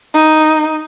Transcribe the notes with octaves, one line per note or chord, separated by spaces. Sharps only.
D#4